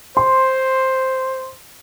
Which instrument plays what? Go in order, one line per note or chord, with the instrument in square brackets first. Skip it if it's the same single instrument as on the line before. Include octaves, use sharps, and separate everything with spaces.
[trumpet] C5 [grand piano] C6